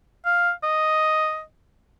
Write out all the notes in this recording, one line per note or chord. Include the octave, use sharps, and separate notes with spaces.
F5
D#5